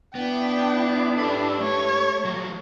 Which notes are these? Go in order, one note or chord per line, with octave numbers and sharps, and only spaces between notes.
B3 D4 E4 G5
G4 A4 B4
A3 C#5
F3 F#3